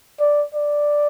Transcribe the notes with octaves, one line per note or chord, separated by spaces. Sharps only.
D5
D5